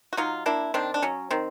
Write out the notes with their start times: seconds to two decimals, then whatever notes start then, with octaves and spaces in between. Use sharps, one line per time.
0.13 F#4
0.17 F#3 D#4 F4
0.46 A#3 D4 E4
0.74 D#3 C4 D4
0.94 D4
1.02 F#3 C#4
1.31 D#3 C4